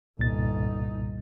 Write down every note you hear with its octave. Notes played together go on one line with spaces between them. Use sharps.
G1 C2 A#2 D#4 A6